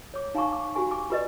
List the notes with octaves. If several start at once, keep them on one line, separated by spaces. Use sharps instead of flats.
C#5 D6
D#4 F5 G#5 A#5 C#6 D6
D6
F#4 G4 G#5 C#6
G#5 D6
F4 G4 B4 D5 D#5